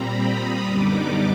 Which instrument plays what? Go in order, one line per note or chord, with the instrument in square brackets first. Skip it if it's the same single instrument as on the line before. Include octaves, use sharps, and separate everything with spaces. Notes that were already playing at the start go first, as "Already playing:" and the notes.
Already playing: [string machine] A#2 G3 C4 A#5 B5
D#6
F#2 D3 G3 B3 D#4 D6
D6